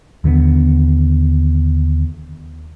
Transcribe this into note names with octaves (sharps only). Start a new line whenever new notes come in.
D#2 D3 G3 B3